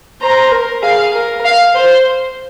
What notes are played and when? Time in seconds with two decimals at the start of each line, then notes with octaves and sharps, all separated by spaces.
0.22 C5 A#5
0.52 A#4
0.82 G#4 F5
1.14 A#4
1.45 F5
1.75 C5